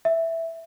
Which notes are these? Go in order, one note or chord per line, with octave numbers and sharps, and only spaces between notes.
E5